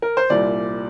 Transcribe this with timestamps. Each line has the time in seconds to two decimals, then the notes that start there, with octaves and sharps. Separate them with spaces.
0.02 A#4
0.17 C5
0.30 C2 A#2 G3 D5